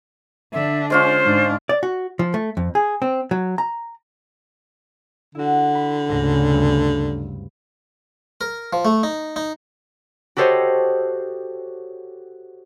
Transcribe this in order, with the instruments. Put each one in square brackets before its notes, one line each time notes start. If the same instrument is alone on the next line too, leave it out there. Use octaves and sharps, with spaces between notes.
[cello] D3 D4 [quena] E5
[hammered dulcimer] G#3 C#4 F4 [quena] C5
[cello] G#2 D4
[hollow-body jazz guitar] D5
F#4
F3
A3
F2
G#4
C4
F#3
A#5
[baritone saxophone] D3 [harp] E4 F#4
[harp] B5
[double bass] D2 C#3 [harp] G#2 A#6
[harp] G2 C3
[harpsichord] A#4
F3
A3
D#4
D#4
[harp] F#4 G4 A4 C5 C#5 D#5